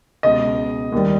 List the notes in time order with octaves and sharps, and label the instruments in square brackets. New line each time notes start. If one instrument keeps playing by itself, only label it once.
[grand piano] C#2 B2 G#3 D#5
D#2 D#3 G3